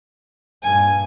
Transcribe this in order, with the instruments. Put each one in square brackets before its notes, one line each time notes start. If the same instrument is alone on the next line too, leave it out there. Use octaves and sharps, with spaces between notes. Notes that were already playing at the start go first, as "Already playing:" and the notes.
[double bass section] G2 A#2 [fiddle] G#5